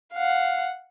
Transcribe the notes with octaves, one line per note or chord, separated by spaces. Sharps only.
F5 F#5